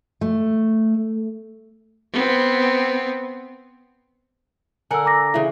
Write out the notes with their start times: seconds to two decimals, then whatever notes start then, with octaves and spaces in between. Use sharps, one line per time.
0.21 A3
2.13 B3 C4
4.91 D3 A#4 F#5 G#5 E6
5.05 A#5 D6 A#6
5.34 C#3 E3